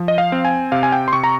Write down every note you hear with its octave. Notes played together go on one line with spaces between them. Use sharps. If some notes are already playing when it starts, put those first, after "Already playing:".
Already playing: F3
D#5
F5
C4
G#5
C3 F5
G#5
G5
C6
C3 C#6
A#5